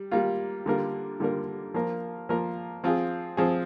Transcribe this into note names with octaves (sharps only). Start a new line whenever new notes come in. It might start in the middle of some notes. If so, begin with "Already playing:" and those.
Already playing: G3
G3 A#3 F4
D3 G3 A#3 F4 A#4
D3 G3 A#3 F4 A#4
F3 A#3 F4 A#4
F3 A#3 F4 A#4
F3 C4 F4 G#4
F3 C4 F4 G#4